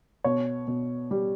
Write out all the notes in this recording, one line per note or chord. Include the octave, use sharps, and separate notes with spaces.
B2 C#5
B2
G3